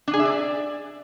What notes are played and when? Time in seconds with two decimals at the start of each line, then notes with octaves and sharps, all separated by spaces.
0.08 D4
0.13 G#4
0.19 E5
0.25 D5